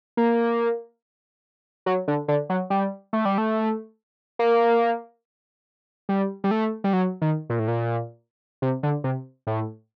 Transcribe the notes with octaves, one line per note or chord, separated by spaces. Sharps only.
A#3
F#3
D3
D3
F#3
G3
A3
G3
A3
A#3
G3
G3
A3
G3
F#3
D#3
A#2
A2
A#2
C3
D3
C3
A2